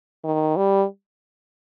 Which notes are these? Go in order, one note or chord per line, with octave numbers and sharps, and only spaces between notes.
D#3
G3